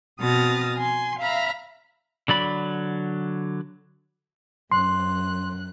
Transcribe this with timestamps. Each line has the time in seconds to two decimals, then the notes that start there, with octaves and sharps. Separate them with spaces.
0.20 B2 C4 D#6 F6 A6 A#6
0.77 G#5 C6
1.20 E5 F5 A#5 B5 F6
2.28 D3 F#3 D5 B5
4.72 F#2 C6 F#6